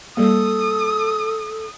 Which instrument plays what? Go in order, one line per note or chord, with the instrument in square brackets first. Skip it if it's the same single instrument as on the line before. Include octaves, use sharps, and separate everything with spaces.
[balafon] G3 A#3 [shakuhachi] A4 [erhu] D#6